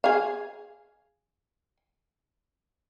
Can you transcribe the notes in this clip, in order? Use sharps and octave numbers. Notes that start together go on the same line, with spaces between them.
G#4 F5